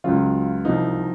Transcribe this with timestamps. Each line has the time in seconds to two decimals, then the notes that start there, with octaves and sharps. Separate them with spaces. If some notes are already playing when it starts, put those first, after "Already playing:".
0.04 C#2 C#3 F#3 F4
0.65 C2 C3 F3 D#4